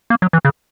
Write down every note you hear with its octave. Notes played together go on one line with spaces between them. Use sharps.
A#3
F#3
E3
C#3